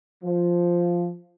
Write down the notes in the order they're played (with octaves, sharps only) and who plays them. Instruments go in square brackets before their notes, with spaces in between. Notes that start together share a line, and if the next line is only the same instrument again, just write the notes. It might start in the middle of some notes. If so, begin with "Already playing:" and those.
[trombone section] F3